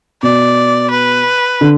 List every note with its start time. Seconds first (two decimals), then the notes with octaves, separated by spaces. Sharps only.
0.23 B2 D5
0.91 B4
1.61 D3